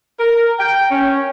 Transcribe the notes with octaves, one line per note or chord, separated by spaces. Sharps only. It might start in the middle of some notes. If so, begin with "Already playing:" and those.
A#4
G5
C#4